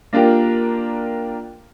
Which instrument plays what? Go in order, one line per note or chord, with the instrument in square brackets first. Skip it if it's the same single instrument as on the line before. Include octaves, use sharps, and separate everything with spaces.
[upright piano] A#3 D4 F4 G4 A#4